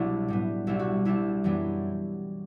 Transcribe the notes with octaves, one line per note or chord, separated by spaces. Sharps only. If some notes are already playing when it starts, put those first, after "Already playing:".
Already playing: C2 B2 F#3 B3 D4 E4 F#4
A2 G3 B3
C2 B2 G3 D4 E4
F#4
C2 C3 G3 D4 E4
F#2 E3 G3 B3 D4